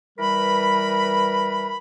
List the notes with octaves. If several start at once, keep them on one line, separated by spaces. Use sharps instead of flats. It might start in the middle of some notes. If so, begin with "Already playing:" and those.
E3 G3 A#4 B4 B5